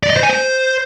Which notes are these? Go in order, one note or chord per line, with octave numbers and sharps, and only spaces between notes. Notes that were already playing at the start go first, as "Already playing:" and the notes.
D5
D#5
C5
G#5
C5